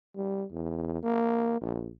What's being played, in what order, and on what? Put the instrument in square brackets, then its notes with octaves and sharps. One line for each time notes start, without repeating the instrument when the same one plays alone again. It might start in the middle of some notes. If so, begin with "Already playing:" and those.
[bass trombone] G3
E2
A#3
A#1